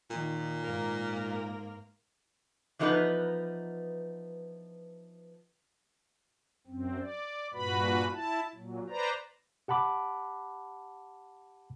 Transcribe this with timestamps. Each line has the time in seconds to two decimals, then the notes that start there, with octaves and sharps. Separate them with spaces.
0.11 A#2 D#3
0.63 G#2 A#3 A#4
2.79 E3 F3 B3 D#4 A#4 B4
6.67 F#2 C4
7.00 D5
7.54 G2 A#2 F#4 B4 B5
8.13 E4 A5
8.55 A#2 F#3
8.89 B4 C5 D5 A#5
9.68 G4 F#5 A5 B5 D6